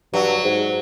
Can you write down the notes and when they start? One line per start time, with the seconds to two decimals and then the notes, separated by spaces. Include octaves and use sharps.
0.14 G2 F#3
0.44 G#2